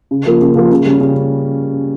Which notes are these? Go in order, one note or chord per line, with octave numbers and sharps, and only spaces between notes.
C#3
F3 A#3 F4
C#3
F3 A#3 F4
C#3
G3 C#4
C#3